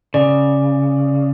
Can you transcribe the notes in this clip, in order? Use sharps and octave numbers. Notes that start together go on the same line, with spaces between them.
C#3 D5